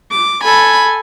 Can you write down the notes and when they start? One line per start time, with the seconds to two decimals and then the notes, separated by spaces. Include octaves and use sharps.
0.11 D6
0.43 A4 G#5 B5